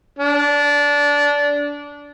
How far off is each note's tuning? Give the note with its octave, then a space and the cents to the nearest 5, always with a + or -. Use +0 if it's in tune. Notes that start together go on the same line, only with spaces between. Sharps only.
D4 -20